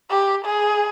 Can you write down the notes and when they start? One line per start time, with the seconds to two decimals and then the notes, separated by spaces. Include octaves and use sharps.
0.10 G4
0.45 G#4